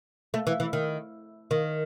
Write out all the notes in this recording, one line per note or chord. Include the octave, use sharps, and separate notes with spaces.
A3
E3
E3
D#3
D#3